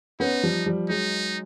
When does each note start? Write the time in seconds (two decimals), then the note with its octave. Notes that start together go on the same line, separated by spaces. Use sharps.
0.20 B3 C#4 D#4
0.43 F3 G3
0.66 F3 G3
0.89 F#3 G#3 D#4